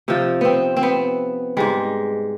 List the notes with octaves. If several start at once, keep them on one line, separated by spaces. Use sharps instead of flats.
C3 F3 D#4
B3 C4
C4
B3
G#2 G3 G#3